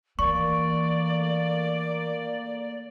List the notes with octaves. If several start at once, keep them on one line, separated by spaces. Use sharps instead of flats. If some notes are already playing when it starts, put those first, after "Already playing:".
E3 A3 A#3 D5 C#6